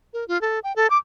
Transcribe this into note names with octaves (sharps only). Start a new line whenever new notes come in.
A#4
F4
A4
G5
A4
D6